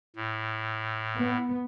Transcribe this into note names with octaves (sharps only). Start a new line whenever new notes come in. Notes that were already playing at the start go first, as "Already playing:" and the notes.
A2
B3